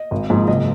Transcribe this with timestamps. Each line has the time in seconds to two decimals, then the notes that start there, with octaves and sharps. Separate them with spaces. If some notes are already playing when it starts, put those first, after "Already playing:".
Already playing: D#5
0.11 G#1
0.30 G#2 F3 A#3
0.48 F#1 D#5